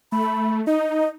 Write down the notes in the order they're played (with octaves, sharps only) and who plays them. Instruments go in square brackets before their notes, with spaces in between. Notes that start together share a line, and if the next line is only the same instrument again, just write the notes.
[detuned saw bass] A3 [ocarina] B5
[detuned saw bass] D#4 [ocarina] D#5